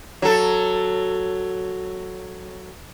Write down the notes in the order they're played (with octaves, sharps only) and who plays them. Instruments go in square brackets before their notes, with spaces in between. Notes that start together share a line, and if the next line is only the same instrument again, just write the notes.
[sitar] F#3 A4